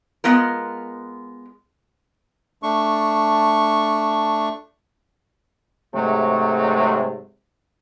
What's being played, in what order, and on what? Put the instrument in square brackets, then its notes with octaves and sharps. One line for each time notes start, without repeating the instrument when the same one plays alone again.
[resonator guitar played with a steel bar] G#3 B3 F4 A#4
[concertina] A3 D4 C#6
[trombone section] G#2 C3 F#3 G#3 A3